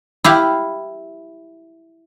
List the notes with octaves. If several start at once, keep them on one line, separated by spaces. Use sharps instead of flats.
E4 G4 F5